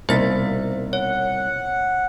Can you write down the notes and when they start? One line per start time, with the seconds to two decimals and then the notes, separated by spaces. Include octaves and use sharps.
0.09 C2 B2 A#3 D#4 C5 A6 B6
0.93 C#5 F#5